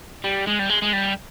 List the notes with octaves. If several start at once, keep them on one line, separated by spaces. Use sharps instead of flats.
G3
G#3
G3
G#3
G#3
G3